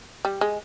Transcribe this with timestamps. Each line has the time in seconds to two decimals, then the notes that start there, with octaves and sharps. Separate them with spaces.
0.25 G3
0.41 G#3